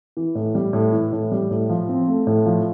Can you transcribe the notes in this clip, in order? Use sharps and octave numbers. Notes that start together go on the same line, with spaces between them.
E3
A2
G3
A2
E3
A2
G3
A2
F3
C4
A3
A2
F3